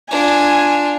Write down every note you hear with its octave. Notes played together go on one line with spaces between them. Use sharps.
D4 F4 G#5